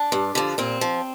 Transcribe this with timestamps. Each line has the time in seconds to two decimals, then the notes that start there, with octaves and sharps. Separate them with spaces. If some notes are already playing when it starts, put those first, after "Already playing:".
Already playing: D4
0.12 G2
0.35 D3 F3
0.58 A#2 C4
0.81 F3